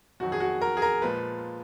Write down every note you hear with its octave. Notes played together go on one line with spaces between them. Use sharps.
F2 D#3 F#3 F#4
G#4
F#4
A#4
G#4
A#4
A#2 F3 G#3 B4